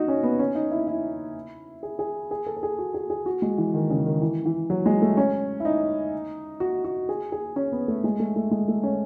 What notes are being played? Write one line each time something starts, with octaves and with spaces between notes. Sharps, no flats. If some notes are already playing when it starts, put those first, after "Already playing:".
Already playing: D#4 F#4
C#4
B3
C#4
D#4
E4
E4
G#4
G#4
G#4
A4
A4
G#4
F#4
G#4
G#4
F#4
G#3
E3
D#3
C#3
D#3
E3
E3
F#3
G#3
A3
C#4
E4
D#4
F#4
F#4
G#4
G#4
C#4
B3
A3
G#3
A3
A3
G#3
A3
C#4